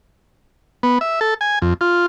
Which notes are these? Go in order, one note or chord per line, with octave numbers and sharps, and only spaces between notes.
B3
E5
A4
G#5
F2
F4